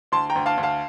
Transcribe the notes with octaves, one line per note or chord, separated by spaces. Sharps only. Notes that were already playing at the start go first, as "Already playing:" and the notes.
D2 A5 C6
G5 A#5
D2
F5 A5
D2
F5 A5